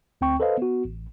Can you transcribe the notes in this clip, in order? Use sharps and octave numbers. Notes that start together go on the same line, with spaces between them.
D2 C4 G5 C#6
A4 B4 C5 D#5 F5
B3 F#4
A1